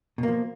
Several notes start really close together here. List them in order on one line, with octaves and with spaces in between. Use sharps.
B2 A#3 F3